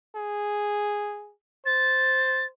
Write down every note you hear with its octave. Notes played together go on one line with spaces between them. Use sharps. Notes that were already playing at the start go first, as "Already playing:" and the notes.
G#4
C5 A6